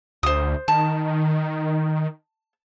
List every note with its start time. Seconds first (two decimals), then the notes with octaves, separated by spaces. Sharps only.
0.23 D2 C5 D#6
0.68 D#3 A5